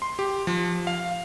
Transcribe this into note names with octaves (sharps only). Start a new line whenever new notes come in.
C6
G4
F3
F5